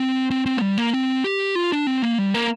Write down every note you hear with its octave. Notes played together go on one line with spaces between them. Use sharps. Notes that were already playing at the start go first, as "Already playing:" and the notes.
Already playing: C4
C4
C4
A#3
G3
A#3
C4
G4
F4
D4
C4
A#3
G3
A#3